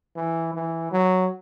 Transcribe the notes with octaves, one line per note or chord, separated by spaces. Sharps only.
E3
E3
F#3